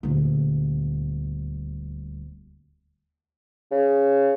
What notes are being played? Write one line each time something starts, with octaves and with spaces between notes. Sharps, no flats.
D#1 D2
C#3